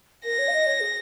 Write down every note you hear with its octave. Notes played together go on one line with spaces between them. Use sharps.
A#4 A#6
C#5
F5
D#5
C#5
G#4